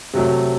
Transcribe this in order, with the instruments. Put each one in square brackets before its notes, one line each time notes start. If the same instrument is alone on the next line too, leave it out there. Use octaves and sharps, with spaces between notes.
[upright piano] C3 F#3 A3